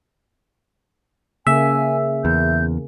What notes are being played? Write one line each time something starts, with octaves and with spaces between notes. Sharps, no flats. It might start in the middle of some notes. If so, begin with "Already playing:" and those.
C#3 A#3 E5 G#5
E2 G6